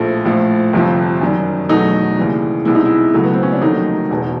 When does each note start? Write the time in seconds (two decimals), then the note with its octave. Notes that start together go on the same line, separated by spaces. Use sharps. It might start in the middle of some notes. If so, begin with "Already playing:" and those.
Already playing: A#1 A2 F3 A3
0.25 A#1 A2 F3
0.73 G1 F2 C3 F3
1.21 F#2 D#3 G3
1.69 E2 B2 F#3 A3 D#4
2.17 D#2 C#3 E3 G3
2.65 C2 B2 G#3 E4
2.75 D#4
2.85 E4
3.14 C#2 C#3 F#3 A3
3.24 B3
3.33 C4
3.43 C#4
3.52 D4
3.62 F1 D#2 D#3 F#3 A3 D#4
4.10 E1 E2 B2